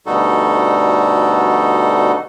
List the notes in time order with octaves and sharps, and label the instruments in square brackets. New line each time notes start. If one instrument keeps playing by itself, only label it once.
[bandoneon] D2 B2 G3 D#4 F#4 A4